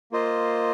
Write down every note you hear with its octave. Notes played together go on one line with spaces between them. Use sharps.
A#3 F4 C5 D#5